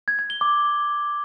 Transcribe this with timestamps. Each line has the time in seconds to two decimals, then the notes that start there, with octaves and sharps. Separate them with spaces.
0.08 G#6
0.19 G#6
0.30 G7
0.41 D6